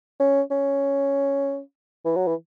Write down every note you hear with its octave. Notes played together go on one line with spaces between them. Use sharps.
C#4
C#4
E3
F#3
E3